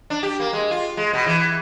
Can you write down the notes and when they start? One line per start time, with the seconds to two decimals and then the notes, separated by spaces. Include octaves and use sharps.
0.10 D4
0.23 G4
0.40 A#3
0.53 G#3
0.71 F4
0.97 G#3
1.13 B2
1.26 E3